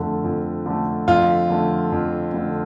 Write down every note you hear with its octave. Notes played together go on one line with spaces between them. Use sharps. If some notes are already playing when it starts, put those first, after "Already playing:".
Already playing: F2 D3 A3
F2
D3 A3
F2 F4
D3 A3
F2
D3 A3